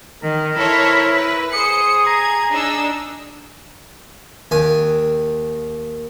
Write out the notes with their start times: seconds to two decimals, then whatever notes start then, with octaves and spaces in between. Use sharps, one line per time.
0.23 D#3 A#4
0.57 E4 A4 C5 C#5
1.11 B4
1.53 G#4 C5 D#6 C#7
2.06 A#5 G#6
2.52 D4 D#4 E6
4.51 D#2 G#5